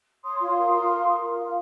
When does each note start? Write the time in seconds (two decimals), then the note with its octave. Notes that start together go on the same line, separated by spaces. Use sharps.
0.23 C#5 C6 D#6
0.40 F4
0.57 A#4
0.72 F4
0.90 A#4
1.06 A#4
1.22 F4
1.39 F4